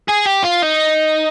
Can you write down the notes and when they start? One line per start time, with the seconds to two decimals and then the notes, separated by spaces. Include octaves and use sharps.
0.09 G#4
0.27 G4
0.44 F4
0.63 D#4